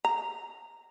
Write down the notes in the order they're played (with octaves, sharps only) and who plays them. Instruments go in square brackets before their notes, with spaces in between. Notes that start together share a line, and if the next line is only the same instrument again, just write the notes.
[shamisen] A#5